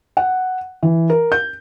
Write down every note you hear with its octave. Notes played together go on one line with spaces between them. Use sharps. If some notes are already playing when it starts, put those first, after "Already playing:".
F#5
E3
A#4
G6